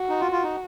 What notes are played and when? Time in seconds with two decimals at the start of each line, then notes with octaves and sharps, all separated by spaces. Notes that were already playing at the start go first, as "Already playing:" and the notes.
Already playing: F#4
0.09 D#4
0.20 F4
0.32 F4
0.44 D#4